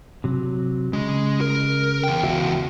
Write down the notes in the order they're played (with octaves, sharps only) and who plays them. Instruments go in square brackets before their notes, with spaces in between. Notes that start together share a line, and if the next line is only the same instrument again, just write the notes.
[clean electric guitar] C3 F#3
[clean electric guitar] C#3 [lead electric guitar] G#3
[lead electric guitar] A#4
E2 G5
[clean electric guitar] C#2 F#4 E5